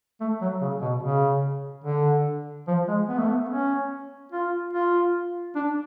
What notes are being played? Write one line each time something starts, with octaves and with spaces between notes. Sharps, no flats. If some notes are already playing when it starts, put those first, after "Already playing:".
A3
F#3
C#3
B2
C#3
D3
F3
G#3
B3
A3
B3
C#4
F4
F4
D4